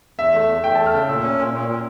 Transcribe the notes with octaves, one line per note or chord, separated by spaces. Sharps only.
E2 E5
A3
E2
E2 G5
A3 A5
F6
C#3
A#2 E6
C#4
A#2
A#2
A#2